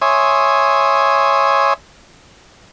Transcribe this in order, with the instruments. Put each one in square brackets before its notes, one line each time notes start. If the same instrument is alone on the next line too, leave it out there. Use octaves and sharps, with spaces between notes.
[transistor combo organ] C#5 E5 G#5 C6 D#6